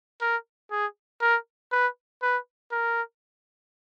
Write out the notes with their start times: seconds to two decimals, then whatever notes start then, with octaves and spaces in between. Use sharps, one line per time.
0.21 A#4
0.71 G#4
1.21 A#4
1.72 B4
2.22 B4
2.72 A#4